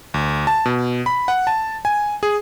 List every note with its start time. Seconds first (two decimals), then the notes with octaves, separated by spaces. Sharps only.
0.14 D2
0.47 A5
0.65 B2
1.06 B5
1.28 F#5
1.47 A5
1.85 G#5
2.23 G#4